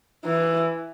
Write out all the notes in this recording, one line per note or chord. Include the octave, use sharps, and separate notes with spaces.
E3